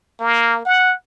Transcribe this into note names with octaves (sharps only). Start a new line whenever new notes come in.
A#3
F#5